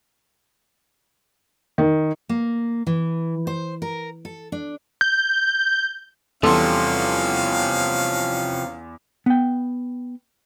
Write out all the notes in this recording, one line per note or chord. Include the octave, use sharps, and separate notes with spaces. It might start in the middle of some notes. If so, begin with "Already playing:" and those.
D#3
A#3
E3
C5
A#4
A4
D4
G6
E2 C3 F3 G3 C#4 A4 F5 C6
B3 G5